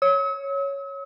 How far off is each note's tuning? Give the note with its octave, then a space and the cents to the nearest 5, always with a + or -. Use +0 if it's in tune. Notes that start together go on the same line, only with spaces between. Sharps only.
C#5 +0 E6 -45